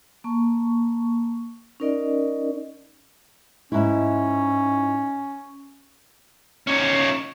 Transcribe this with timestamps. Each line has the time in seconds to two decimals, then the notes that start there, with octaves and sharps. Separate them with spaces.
0.24 A#3 A5 C#6
1.80 C#4 D#4 A#4 D5 D#5
3.72 G#2 C#4 E4
6.67 C#4 D#4